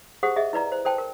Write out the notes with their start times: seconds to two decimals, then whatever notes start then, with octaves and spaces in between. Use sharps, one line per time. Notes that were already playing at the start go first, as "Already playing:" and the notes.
0.23 G4 G#4 C5 F#5 D#6
0.36 G#4 D#5 E5
0.53 E4 B4 D5 A#5
0.72 C5
0.85 A4 C5 G5 A5
0.98 A#4